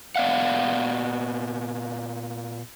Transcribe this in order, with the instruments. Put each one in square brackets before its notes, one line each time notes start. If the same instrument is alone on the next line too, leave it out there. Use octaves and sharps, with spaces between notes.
[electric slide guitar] A#2 B3 D5 F5 F#5